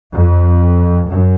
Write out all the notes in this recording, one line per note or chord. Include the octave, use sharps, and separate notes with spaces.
F2
F#2